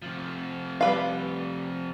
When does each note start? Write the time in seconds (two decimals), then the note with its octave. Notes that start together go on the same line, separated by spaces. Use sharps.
0.02 C3 F3
0.81 G3 B4 F5